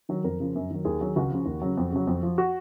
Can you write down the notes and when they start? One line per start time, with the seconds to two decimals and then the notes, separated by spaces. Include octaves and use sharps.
0.09 D#3 F#3
0.24 F2 A#4
0.40 C#3 F3
0.55 F#2
0.70 D#3 F#3
0.85 D#2 G#4
1.01 D#3 F#3
1.16 C#2 F#4
1.30 C#3 F3
1.46 D#2
1.62 C#3 F#3
1.77 F2
1.92 C#3 F#3
2.07 F2
2.23 F3
2.38 F#4